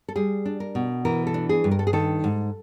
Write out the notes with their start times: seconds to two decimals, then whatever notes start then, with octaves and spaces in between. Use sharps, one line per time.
0.08 A4
0.16 G3 G#4
0.45 D4
0.60 A#4
0.75 B2
1.05 E3 A#4
1.27 A4
1.34 D4
1.49 G#4
1.64 G2
1.71 A#4
1.79 A4
1.87 G#4
1.93 D#3 A4
2.24 G#2